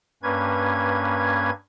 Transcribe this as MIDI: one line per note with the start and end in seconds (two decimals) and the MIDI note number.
0.23 1.50 43
0.23 1.50 58
0.23 1.50 61
0.23 1.50 71
0.23 1.50 92